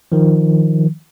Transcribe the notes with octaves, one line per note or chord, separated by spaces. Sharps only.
D#3 F3